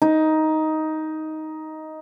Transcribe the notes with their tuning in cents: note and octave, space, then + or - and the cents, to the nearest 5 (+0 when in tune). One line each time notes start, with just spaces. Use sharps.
D#4 +10